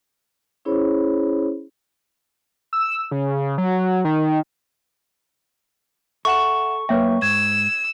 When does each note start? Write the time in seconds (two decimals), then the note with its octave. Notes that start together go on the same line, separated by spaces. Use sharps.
0.65 C#4 E4 G#4 C5 C#5 B5
2.73 E6
3.11 C#3
3.58 F#3
4.05 D#3
6.25 A4 E5 F#5 C#6 E7
6.89 F#2 A#3 B4 C#5 E5 G5
7.22 G#2 E6 G#6